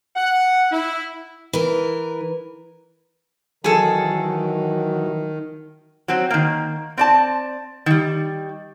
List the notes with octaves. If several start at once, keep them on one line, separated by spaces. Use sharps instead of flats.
F#5
E4
E3 A#4
D#3 E3 F#3 G#4 A4
F#3 C4
D#3 A#3
C4 D5 A5
D#3 G3